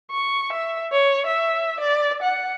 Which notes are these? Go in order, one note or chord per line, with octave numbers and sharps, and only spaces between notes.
C#6
E5
C#5
E5
D5
F#5